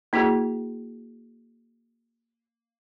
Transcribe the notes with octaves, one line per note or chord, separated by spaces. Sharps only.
A#3 E4 F#4 G#4